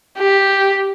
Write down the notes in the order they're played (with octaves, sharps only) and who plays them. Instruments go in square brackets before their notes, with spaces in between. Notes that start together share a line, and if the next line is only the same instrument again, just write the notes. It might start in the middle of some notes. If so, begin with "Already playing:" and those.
[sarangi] G4